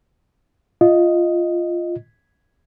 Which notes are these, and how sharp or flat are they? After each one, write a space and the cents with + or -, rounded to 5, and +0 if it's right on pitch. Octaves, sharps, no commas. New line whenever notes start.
F4 -5 D#5 +0